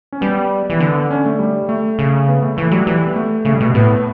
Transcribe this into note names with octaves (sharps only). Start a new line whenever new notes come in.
C#4
G3 B3
E3
D3 B3
C#4
A3
G3
A3
C#3
B3
A3
E3 A3
F#3 G3
E3
B3
A3
C#3 A3
G3
B2 A3
A2 B3